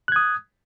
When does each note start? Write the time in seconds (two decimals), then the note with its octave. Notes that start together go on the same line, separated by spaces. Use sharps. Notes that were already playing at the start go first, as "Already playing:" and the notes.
0.08 F#6
0.12 G#6
0.16 D#6